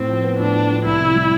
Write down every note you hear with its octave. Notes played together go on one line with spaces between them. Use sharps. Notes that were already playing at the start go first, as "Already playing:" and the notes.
Already playing: A2 C4
F3
B3
A2 D4
A2
F3
C2 E4
C3
G3